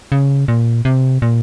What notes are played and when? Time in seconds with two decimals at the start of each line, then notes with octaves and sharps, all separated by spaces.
0.12 C#3
0.48 A#2
0.85 C3
1.22 A#2